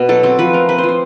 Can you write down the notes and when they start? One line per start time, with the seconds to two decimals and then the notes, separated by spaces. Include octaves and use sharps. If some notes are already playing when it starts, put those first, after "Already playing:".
Already playing: B2
0.09 F#3 A4
0.23 C4 A4
0.39 F3 B4
0.53 A3 A#4
0.69 C4 B4
0.78 C5
0.84 F3
0.89 C5